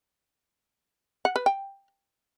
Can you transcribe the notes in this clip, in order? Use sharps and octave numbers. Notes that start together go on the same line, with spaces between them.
F#5
B4
G5